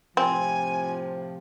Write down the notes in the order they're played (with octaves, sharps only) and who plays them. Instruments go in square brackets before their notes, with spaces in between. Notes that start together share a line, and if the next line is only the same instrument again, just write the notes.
[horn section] A2 C3 F3 [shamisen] C4 [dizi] G#5